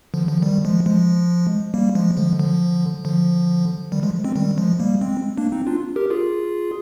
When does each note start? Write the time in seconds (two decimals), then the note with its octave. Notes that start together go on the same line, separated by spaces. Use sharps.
0.14 D3 F3
0.28 D3 F3
0.42 D#3 G3
0.65 F3 G#3
0.86 F3 G#3
1.74 G3 A#3
1.95 F3 G#3
2.17 D3 F3
2.39 D3 F3
3.05 D3 F3
3.92 D#3 G3
4.03 F3 G#3
4.24 G#3 C4
4.36 D#3 G3
4.57 F3 G#3
4.79 G3 A#3
5.01 G#3 C4
5.38 A#3 D4
5.52 C4 D#4
5.67 D4 F4
5.96 G4 A#4
6.10 F4 G#4